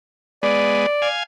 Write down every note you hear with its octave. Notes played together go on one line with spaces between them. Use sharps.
G#3 B3 D5
F5 G#5